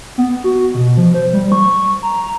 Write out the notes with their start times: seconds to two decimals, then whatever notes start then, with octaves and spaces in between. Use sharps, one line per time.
0.18 B3
0.44 F#4
0.74 B2
0.97 F3
1.14 C5
1.33 G3
1.52 C#6
2.03 A#5